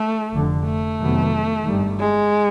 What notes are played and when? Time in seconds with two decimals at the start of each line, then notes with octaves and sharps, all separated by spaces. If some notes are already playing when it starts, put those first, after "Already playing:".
Already playing: A3
0.32 F1 F2 D3
0.65 A3
0.98 F2 C3 D#3 F#3 B3
1.65 G1 G2 D#3 G3
1.99 G#3